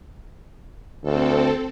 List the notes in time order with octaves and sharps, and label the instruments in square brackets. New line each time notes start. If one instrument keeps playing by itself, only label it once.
[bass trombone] D2 [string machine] C4 A4